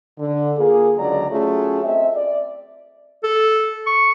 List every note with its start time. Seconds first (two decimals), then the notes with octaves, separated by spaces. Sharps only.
0.18 D3
0.58 A#3 F4 G#4
0.98 C#2 D3 F#3 D5 A#5
1.30 F#3 A3 C#4 F4 G#4
1.83 C4 D#5 E5
2.16 D5
3.23 A4
3.86 C#6